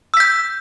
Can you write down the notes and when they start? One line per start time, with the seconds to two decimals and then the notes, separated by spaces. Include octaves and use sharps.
0.14 E6
0.17 B6
0.20 G6